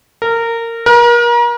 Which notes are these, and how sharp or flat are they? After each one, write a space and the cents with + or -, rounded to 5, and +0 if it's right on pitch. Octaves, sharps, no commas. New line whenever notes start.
A#4 -20
A#4 +35